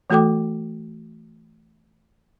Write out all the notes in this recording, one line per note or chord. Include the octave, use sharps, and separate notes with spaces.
E3 A3 F#4 A4 G5 D6